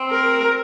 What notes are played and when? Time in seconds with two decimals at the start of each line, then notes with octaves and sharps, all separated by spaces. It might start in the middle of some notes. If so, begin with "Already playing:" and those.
Already playing: C4
0.11 A#4